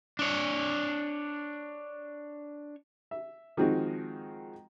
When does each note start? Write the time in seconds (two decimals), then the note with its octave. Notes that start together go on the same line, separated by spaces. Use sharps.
0.19 D4 C#5
3.11 E5
3.57 D#3 F3 G#3 C4 D#4 F#4